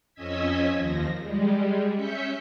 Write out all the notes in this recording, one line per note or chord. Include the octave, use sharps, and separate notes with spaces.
F2 C#4 D#5 E6 G#6 B6
D#2 F3 A#6
G3 G#3
C#4 E5 G6 B6 C#7